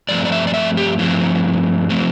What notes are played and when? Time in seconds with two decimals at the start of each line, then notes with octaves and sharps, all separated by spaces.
0.08 G2 F3 A3 C4 D5
0.25 D5
0.32 E5
0.47 D5
0.54 E5
0.77 G4
0.99 G2 F3 A3 C4 E4
1.90 F3 A3 C4